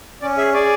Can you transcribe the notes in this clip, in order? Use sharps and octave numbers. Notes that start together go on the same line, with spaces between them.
C#4 D5
G#4 E5
G#4 D5